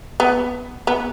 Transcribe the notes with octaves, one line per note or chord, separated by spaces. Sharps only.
B3
B3